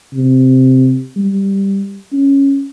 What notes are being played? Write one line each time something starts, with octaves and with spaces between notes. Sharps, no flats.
C3
G3
C#4